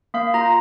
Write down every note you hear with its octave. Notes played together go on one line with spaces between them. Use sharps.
A#3 F5
F4 A#5